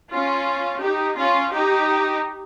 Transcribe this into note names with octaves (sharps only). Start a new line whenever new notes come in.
C#4 F4
D#4 G4
C#4 F4
D#4 G4